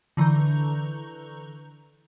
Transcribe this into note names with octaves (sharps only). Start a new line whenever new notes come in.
D3 E3 A#5 C#6 G6